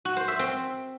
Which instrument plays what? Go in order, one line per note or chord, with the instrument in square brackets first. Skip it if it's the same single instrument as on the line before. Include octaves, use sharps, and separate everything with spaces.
[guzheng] F#4
C5
E5
C4